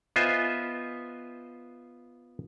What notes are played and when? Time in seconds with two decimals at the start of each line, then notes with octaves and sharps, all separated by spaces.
0.16 B3 F4 C5 D#5 E5 G#5